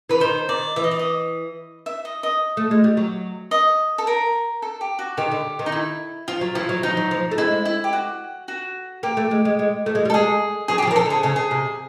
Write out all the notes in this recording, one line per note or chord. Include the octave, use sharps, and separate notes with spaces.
E3 B4
D#3 C5
D#3 D5
E3 E5
D#5
D5
D#5
E5
D#5
D#5
A3
G#3
G3
F#3
D#5
A4
A#4
A4
G4
F#4
D#3 G4
D3
D#3
D#4
E4
F3 F4
F#3
F3 E4
F#3
F3 D#4
F#3
F3
A3
G#3 E4
E4
G4
F#4
F#4
A#3 G4
A3
G#3
G#3
G#3
A3
G#3
G3
A4
G#3 G#4
F#3 G#4
G4
F#3 G#4
F3
A#4
A4
D3
G#4
C#3 A4
G#4
C3